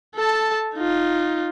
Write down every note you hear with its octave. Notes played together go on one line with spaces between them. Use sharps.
A4 A5
D#4 F4